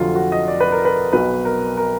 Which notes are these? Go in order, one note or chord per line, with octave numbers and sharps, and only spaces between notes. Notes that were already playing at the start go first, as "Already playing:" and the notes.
Already playing: F1 F2 D3 F#3 F4
F#4
D#5
D5
B4
A#4
B4
B1 B2 F#3 B4
A#4
A#4